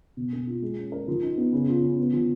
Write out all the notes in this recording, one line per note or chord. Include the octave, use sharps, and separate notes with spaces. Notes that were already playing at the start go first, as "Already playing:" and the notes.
B2
A#3
F4
G#3
C#4
A#4
F3
D#4
B3
C#3
F4
C#3
B3
F3